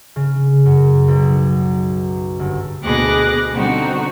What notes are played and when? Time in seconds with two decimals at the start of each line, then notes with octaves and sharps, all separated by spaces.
0.16 C#3
0.65 F#2
1.08 B1
2.39 G1
2.83 D2 B2 G#4 D6 F#6 A#6
3.53 B2 D3 G3 C4 D#4 F#4